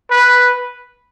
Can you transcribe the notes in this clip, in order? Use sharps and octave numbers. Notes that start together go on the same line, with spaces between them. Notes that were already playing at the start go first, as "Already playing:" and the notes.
B4